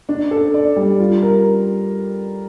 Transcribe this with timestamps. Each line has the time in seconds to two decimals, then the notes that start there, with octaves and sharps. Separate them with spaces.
0.09 D4
0.31 A4
0.54 D5
0.76 G3
0.99 F4
1.23 A#4